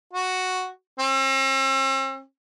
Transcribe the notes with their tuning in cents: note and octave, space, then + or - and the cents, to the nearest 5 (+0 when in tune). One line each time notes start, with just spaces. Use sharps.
F#4 +0
C4 +45